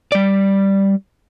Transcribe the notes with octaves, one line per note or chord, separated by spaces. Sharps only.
G3 D5